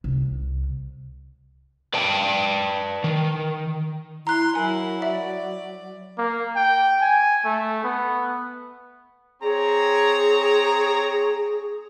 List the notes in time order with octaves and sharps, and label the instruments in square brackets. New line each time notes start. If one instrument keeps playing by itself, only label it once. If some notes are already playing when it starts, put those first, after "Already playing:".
[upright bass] C2
[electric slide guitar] B4 D5 G5 A5
D#3
[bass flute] E4 [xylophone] A#5 F#6 [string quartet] C6
[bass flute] F#3 [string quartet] E4 A#4 [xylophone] G#5
[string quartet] D5 [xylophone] E5
[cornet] A#3
G5
G#5
A3
B3
[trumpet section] C4 C#5 A#5 [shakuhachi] G#4